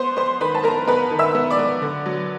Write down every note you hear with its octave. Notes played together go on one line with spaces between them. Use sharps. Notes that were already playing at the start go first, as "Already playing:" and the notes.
Already playing: B3 C5 C6
B3 C5 C6
D#3 B4 B5
A5
B3 A#4 A#5
B3 B4 B5
D#3
E5 E6
B3
D5 D6
B3
D3
F#3